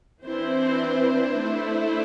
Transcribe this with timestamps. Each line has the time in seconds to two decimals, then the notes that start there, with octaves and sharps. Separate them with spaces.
0.24 E3 C4 D4 E4 C5
0.54 D4
0.83 D4
1.40 A3 E4 C5